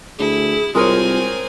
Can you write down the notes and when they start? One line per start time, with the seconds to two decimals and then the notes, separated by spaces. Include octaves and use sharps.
0.19 D2 E4 G#4
0.75 C2 G#3 C4 F4 A#4 C#5 G#5